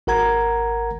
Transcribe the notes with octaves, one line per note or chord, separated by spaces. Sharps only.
G#1 A#4 F#5 A#5 G#6